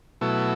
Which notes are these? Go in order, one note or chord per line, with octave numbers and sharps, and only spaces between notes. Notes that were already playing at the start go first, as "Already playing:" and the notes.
B2 F#3 A3 E4